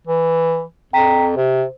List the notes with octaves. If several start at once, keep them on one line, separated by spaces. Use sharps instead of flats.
E3
F2 G5 A#5 B6
C3 C5